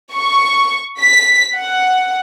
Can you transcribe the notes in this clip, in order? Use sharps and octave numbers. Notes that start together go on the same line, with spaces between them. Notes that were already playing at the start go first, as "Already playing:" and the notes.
C#6
B6
F#5